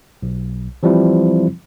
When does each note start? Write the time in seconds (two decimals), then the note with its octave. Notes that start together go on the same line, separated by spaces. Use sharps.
0.23 B1
0.83 E3 F3 G3 C4 E4